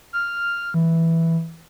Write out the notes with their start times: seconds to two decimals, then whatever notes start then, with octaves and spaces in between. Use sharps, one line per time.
0.13 F6
0.74 E3